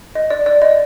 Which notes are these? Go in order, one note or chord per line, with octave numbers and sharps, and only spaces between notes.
D#5
D5
D5
D#5